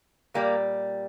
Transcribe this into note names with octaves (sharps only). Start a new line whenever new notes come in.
A#2 G3 A#3